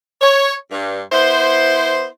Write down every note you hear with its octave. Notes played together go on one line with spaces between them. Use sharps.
C#5
G2
B3 E4 C5